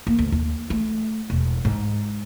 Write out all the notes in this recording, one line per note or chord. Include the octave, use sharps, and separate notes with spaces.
A#3
D2
D#2
A3
E1
G#2